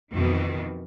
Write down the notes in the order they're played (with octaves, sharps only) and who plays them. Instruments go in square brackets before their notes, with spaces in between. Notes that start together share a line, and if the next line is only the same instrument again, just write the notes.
[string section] F2 B2 D#3 E3